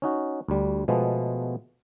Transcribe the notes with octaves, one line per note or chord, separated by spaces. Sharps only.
C#4 D#4 F#4
D2 G3
B2 F3 G#3 A3 B3